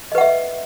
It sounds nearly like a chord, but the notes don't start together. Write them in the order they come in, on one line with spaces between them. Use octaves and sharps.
D#5 B4 F#5 E5